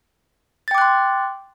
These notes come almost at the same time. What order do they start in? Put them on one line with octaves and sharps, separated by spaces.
A6 G5 D6 F#6 C6